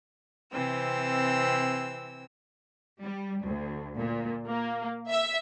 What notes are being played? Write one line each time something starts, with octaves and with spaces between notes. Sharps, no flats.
C3 E3 C4 E6
G3
D2
A#2
A#3
E5